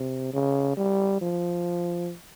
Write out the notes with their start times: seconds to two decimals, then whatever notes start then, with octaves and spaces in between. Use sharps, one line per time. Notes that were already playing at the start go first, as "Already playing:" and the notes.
Already playing: C3
0.33 C#3
0.77 G3
1.21 F3